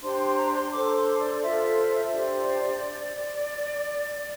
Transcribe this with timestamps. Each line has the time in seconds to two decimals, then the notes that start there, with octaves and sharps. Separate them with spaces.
0.01 D4 G4 C5 C6
0.18 C6
0.37 A#5
0.54 C6
0.71 D4 A4 C5 D6
0.95 C6
1.19 D5
1.42 F4 A4 C5 E5
2.13 D4 G4 C5 D5